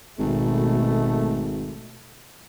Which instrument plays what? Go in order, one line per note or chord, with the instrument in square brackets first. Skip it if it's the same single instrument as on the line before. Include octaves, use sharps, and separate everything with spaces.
[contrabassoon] G#1 [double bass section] B2 A3